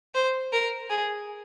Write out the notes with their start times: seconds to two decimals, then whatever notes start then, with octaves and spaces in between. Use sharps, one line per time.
0.15 C5
0.53 A#4
0.90 G#4